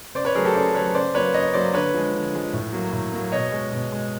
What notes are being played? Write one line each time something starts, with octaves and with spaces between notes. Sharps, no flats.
C#3 C5 D5
B4 C#5
F#3 A3 G#4 A#4
G4 A4
C#3 C5 D5
F#3 A3 B4 C#5
C#3 C5 D5
F#3 A#3 B4 C#5
C#3 C#5 D#5
F#3 A#3 C5 D5
D3 B4 C#5
F3 G#3
D3
F3 G#3
A2
F#3 A#3
A2
F#3 A#3
B2 C#5 D#5
G#3
B2
G#3